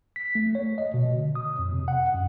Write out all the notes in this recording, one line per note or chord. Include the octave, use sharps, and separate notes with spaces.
B6
A3
C#5
D#5
B2
D3
D#6
F2
C3
F#5
F#2